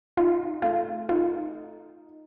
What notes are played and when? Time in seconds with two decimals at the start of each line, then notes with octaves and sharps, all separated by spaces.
0.17 D#4 F4
0.62 A3 F4
1.09 D#4 F4